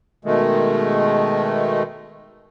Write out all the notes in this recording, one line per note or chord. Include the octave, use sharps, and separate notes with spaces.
B2 D#3 G#3 A3